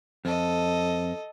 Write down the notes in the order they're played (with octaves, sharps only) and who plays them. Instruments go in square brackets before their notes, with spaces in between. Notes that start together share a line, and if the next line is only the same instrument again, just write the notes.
[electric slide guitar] F2 [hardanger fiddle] A4 D#5